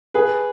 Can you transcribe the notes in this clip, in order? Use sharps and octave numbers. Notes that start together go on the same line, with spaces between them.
G#4 B4